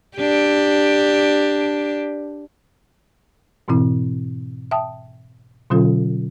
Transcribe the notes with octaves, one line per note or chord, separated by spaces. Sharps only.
D4 G4
G#2 B2 E3 C4 E4
E5 G5 A5 D#6
B2 D3 F#3 C#4 F4 A4